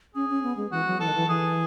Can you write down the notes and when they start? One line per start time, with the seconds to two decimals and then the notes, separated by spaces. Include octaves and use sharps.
0.15 C#4 G#4
0.30 C#4
0.43 B3
0.57 G#3
0.72 E3 F#4
0.86 F#3
1.00 E3 A4
1.08 D#3
1.15 E3
1.28 E3 G#4